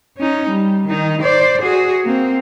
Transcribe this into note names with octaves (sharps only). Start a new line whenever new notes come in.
C#4 D#4
G3
D#3 D#4
C5 D5
F#4 G#4
A#3 C4